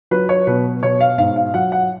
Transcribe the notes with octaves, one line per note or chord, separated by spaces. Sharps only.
F#3 B4
C#5
B2 B4
B2 C#5
F5
G#2 F5
F5
F#3 F#5
F#5